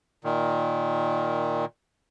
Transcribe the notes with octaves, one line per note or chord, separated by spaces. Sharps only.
A#2 D#3